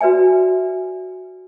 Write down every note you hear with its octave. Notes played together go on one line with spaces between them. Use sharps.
F#4 B4 D5 E5 G#5